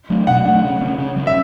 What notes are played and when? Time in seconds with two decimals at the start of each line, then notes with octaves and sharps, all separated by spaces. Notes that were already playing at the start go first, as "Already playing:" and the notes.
0.10 F#3 A3 D4
0.27 B2 F#5
0.46 F#3 A3 D4
0.63 C#3
0.81 G3 C#4
0.98 C#3
1.16 G3 C#4
1.27 E5